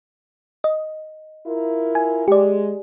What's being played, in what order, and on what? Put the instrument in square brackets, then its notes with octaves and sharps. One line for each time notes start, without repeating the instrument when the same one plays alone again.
[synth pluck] D#5
[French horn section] E4 F4 A#4
[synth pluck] G#5
[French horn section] G#3 [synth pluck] G4 D5